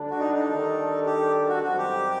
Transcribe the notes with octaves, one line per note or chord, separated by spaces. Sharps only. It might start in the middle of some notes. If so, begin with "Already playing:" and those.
Already playing: D2 D3 G3 D4
F#4
D#4
D#4
D#3 G3 D4 A4
G4
F#4
F#2 D#3 G3 C4 D#4 F#4
G4